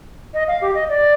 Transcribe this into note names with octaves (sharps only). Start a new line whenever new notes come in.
D#5
F5
G4
D#5
D5